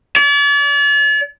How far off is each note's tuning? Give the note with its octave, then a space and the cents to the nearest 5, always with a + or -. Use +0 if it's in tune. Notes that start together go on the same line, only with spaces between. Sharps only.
D5 -40